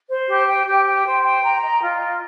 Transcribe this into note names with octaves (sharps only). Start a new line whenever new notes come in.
C5
G4
G5
G4
G5
C5
G5
A#5
D#5
F4
D#5